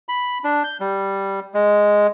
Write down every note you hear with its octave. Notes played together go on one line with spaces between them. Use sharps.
B5
D4
G6
G3
G#3